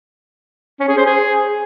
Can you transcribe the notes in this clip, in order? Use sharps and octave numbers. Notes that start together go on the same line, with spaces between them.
C#4
G#4
C5
G#4